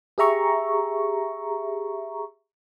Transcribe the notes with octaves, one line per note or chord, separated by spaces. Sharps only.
G4 G#4 E5 A#5 C#6